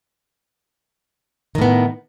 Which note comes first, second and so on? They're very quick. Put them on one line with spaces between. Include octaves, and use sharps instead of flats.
D#3 A2 B3